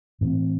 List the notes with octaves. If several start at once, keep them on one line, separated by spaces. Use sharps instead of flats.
A2 E3 C4